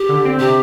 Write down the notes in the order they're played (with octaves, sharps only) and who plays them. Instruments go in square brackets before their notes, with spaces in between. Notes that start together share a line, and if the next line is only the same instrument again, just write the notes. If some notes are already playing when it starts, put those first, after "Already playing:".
Already playing: [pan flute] G4
[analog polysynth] D3
C4
[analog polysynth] C3 [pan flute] G4